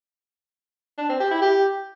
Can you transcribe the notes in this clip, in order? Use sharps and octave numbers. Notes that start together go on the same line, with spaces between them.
D4
C4
G4
E4
G4